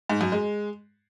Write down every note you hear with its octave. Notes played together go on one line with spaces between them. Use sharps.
G#2
F#2
G#3